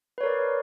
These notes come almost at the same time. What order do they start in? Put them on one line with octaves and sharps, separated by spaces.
B4 C#5 A#4 D5